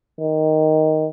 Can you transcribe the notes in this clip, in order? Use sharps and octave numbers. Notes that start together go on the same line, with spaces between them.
D#3